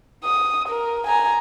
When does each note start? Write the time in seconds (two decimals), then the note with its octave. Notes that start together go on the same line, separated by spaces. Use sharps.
0.24 D#6
0.68 A#4
1.06 G#5 A#5